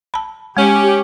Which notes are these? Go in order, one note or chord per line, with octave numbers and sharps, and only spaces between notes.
A5 B5
G#3 C#4 G4